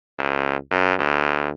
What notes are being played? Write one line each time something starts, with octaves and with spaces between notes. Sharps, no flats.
C#2
F#2
D2